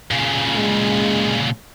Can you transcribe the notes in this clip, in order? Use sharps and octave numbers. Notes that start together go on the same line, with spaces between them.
A#2 C#3
G#3